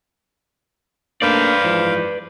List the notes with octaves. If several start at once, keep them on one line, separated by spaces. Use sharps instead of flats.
A3 A#3 D4 B4 C5 D5 F5
G#2 E3 F3